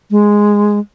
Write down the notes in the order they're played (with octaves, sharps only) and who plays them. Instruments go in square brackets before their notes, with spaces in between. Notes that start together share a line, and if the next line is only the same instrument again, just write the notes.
[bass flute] G#3